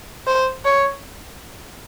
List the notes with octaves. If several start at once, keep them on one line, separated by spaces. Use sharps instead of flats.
C5
C#5